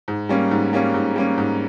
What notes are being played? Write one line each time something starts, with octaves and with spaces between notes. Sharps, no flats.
G#2
G3 A#3 C#4
G#2
G3 A#3 C#4
G#2
G3 A#3 C#4
G#2